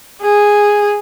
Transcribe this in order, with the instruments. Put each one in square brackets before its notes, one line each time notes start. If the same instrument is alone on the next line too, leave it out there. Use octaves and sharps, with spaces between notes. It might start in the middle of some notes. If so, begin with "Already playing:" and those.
[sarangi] G#4